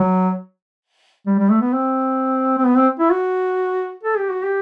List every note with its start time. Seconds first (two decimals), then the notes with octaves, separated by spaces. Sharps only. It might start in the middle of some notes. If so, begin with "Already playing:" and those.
Already playing: F#3
1.27 G3
1.39 G3
1.50 A3
1.61 B3
1.73 C4
2.58 C4
2.65 B3
2.77 C4
3.00 E4
3.11 F#4
4.03 A4
4.18 G4
4.30 F#4
4.44 G4